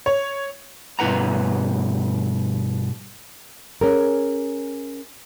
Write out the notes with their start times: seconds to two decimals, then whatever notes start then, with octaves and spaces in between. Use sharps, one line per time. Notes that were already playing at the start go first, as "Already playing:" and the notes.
0.06 C#5
0.99 G2 B2 E4 B4 F#5 A#5
3.81 C#4 G#4 A#4